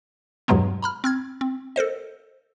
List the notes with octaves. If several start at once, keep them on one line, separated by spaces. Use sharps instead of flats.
E2 G2 B2 F#3 G#3 B3
A#5 B5 F6
C4 F6 G#6
C4
A4 A#4 C5 D#5